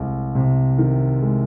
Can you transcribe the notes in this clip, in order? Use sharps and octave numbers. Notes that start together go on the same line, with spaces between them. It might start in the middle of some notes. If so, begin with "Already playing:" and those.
Already playing: C2 G#3
C3
D#3
G#3